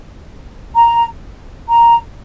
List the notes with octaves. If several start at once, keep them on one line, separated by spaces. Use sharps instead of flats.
A#5
A#5